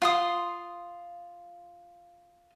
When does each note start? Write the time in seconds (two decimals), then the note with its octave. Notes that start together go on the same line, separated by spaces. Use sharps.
0.02 F4 C6 D#6